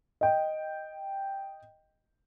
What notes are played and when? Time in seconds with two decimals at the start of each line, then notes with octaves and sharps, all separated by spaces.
0.21 D#5 G5